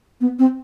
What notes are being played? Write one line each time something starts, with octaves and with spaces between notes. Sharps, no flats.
B3
C4